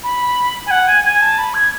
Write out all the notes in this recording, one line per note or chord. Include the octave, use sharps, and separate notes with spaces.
B5
G#5
F#5
G#5
G#5
A5
B5
G#6